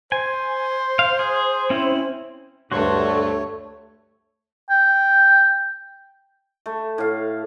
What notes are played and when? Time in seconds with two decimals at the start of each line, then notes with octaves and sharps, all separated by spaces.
0.12 C5 G#5
0.99 F5
1.19 G#4
1.70 C4 C#4 E4
2.71 D2 G2 A3 F#4 C5 C#5 C#6
4.70 G5
6.66 A3
6.98 A2 F5